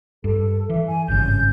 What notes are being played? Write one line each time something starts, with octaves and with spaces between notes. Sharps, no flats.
G2 A4
E3 E5
G#5
G#1 G2 C#3 G6